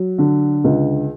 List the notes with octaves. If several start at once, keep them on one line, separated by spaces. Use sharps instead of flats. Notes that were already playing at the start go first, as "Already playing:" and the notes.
Already playing: F#3
D3
C#2